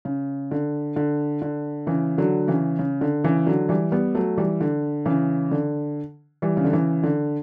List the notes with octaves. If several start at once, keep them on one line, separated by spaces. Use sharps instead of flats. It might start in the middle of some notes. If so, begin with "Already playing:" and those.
C#3
D3
D3
D3
C#3 E3
D3 F#3
C#3 E3
C#3
D3
C#3 E3
D3 F#3
E3 G3
G3 B3
F#3 A3
E3 G3
D3
C#3 E3
D3
E3 G3
C#3
D3
C#3 E3
D3